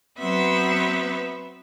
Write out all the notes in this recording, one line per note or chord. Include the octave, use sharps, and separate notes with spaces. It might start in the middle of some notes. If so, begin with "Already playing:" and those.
F#3 B3 C4 B4 E5